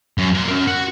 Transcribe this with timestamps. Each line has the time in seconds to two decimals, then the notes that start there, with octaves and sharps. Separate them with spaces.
0.18 F#2
0.34 A#3 C6
0.48 C#4 A#4
0.67 F#4